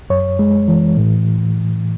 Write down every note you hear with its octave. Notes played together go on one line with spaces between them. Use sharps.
F#2 C#5
G#3
E3
A2